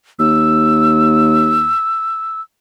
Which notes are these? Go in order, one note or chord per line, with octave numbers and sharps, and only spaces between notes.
D#2 E6